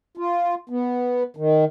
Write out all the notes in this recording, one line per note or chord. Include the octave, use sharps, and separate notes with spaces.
F4
B3
D#3